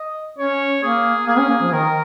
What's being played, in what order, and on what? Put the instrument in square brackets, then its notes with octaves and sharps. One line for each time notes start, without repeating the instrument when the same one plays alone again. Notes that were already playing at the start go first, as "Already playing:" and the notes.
Already playing: [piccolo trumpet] D#5
[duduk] C#4 [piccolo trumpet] C#5
[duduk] A#3 [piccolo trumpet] G#4
[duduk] A#3 [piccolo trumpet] G#4
[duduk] C#4
A#3
F3
[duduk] D#3 [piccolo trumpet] A#4